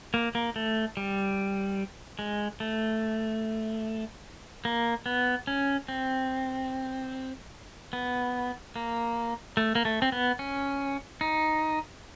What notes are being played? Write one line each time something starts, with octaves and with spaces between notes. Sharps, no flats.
A#3
A#3
A3
G3
G#3
A3
A#3
B3
C#4
C4
B3
A#3
A3
A#3
A3
C4
B3
C#4
D#4